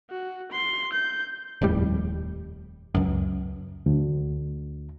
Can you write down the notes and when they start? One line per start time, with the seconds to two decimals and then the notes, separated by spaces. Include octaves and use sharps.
0.10 F#4
0.52 C6
0.93 G6
1.62 D#1 F2 A2 G3
2.95 C#2 F#2
3.86 D2